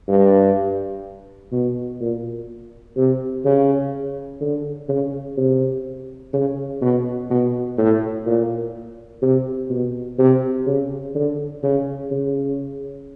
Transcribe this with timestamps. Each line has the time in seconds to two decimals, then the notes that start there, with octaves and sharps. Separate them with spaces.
0.08 G2
1.52 B2
2.00 A#2
2.97 C3
3.45 C#3
4.41 D3
4.89 C#3
5.37 C3
6.33 C#3
6.82 B2
7.30 B2
7.78 A2
8.26 A#2
9.22 C3
9.70 B2
10.18 C3
10.66 C#3
11.15 D3
11.63 C#3
12.11 C#3